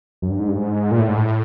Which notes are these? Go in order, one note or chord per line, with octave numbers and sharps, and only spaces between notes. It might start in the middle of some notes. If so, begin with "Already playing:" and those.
F#2
G2
G#2
G2
G#2
A#2
A2
G#2
A2